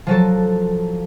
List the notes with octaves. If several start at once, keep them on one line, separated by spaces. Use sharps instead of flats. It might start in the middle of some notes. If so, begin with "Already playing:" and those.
F3 F#3 A4